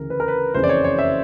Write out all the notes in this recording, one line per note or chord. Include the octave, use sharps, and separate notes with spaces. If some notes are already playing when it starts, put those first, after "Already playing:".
Already playing: D2 C#3 E3 A#4
B4
A#4
B4
F#1 F2 C#3 E3 C5
D5
C#5
C#5
E5